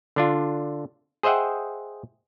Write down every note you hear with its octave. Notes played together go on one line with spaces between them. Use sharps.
D3 D4 F4
G#4 C5 D#5 E5 F#5 G5